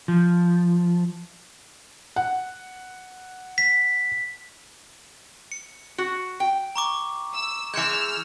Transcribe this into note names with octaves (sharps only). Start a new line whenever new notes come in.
F3
F#5
B6
C#7
F#4
G5
A#5 C#6 D6
E6
E3 G#3 E6 F6 G6 C#7